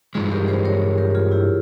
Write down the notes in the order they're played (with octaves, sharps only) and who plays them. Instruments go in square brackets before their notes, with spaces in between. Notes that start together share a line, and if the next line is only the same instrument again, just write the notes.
[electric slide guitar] G2 E3 G#3 [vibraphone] F4 G#4
[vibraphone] G4 A#4
G#4 C5
A#4 C#5
G4 A#4
F4 G#4
E4 G4